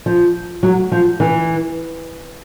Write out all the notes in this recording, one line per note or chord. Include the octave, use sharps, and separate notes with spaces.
F3
F#3
F3
E3